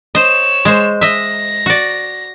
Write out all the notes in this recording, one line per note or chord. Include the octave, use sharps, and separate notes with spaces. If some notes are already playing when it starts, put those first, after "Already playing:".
C5 C#5 D#5 E7
G#3 C5
D#5 E5 A#6
F#4 D5